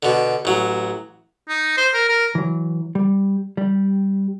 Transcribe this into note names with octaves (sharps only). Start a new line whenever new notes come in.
B2 D3
A1 F#3
D#4
C5
A#4
A#4
E3 F#3
G3
G3 G4